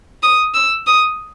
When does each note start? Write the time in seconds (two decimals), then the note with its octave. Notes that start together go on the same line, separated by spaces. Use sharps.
0.23 D#6
0.54 E6
0.87 D#6